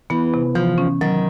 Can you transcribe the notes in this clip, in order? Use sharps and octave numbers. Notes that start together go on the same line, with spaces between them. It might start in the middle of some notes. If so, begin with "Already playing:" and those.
E3 B3
C3
E3 F3
C#4
D#3 F#3